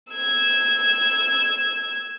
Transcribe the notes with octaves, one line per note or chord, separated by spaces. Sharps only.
E6 G#6